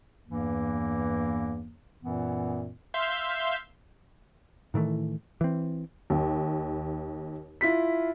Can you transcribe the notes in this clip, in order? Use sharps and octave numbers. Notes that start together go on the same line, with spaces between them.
E2 G2 E3 A#3
F#2 A#2 E3 B3
E5 F5 C6 G6
A2 D#3 E3 A3
E3 C4
D#2
E4 F4 B6